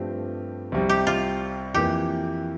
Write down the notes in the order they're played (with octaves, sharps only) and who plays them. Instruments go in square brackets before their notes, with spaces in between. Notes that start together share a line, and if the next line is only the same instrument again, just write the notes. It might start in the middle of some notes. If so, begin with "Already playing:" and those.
Already playing: [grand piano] G2 F3 A3 C4 G4
C2 C3 G3
[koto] G4
F4
[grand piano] F2 E3 A#3 [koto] G4